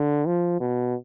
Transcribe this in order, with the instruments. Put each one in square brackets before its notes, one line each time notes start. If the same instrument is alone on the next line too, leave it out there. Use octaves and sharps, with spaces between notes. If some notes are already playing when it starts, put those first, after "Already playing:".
Already playing: [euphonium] D3
F3
B2